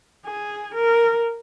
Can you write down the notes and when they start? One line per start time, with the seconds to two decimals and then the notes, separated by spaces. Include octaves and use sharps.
0.26 G#4
0.75 A#4